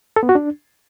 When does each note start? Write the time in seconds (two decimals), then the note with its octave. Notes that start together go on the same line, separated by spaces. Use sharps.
0.16 A4
0.23 B3
0.29 F#4
0.35 D4